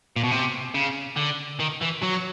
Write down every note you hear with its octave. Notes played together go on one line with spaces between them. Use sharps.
A#2
B2
C3
C#3
D3
D#3
E3
F#3